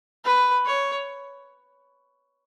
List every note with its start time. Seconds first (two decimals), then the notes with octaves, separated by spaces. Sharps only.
0.25 B4
0.65 C#5